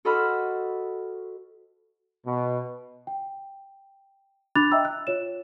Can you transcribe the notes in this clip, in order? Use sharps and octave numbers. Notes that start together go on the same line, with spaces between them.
F#4 A4 C5 D#5 B5 F6
B2
G5
D4 B5 D6 F#6 A6 F7
D#5 E5 G5 A#5 E6
F#6
F4 C#5 E7